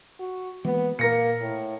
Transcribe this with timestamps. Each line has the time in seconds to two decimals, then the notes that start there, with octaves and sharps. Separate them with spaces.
0.19 F#4
0.65 E3 G#3 A#3 B3
0.99 A#2 A#3 A#4 A#6 C#7
1.41 A2